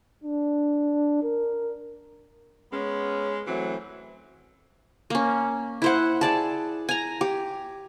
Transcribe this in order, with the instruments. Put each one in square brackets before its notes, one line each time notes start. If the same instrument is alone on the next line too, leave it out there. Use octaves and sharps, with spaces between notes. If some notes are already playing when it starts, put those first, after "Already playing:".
[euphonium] D4
A#4
[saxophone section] G#3 B3 C#4
E3 F#3 A3 C4
[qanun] A#3 C#4
E4 C5 F#5
G#4 D5 A5
G#5 A#5
G4